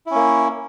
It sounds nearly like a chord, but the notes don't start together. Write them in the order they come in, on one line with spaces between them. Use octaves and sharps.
E4 C#4 A#3